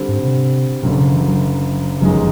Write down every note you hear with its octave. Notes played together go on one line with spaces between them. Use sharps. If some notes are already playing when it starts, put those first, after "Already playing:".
Already playing: D3 G3 C4
G#2
C3
F#1 F#2 B2 D3
C#3
E3
F#3
G1 F#2 D#3 F#3 G#3
F3